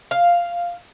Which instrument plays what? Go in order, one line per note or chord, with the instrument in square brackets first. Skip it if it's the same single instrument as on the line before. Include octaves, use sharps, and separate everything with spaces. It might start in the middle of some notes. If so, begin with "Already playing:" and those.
[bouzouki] F5